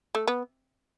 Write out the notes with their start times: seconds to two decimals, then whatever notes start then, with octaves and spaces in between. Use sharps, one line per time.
0.15 A3
0.27 B3